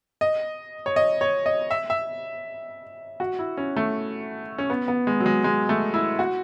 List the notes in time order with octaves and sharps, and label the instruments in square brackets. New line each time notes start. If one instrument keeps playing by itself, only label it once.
[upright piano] D#5
C#5
D#5
C#5
D#5
E5
E5
F#4
E4
C#4
A3
C#4
B3
B3
G#3
F#3
G#3
G#3
A3
E4
F#4